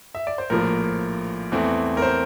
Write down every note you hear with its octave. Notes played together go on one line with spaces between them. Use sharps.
E5
D5
C5
A#1 A2 F3 A#3 A#4
E2 E3 A3 C4
A#4
C5